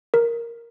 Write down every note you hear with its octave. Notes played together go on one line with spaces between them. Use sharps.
A#4